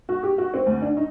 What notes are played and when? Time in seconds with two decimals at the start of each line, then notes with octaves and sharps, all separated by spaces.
0.09 F#4
0.23 G4
0.38 F#4
0.54 C4
0.66 D2
0.82 D4
0.97 D#4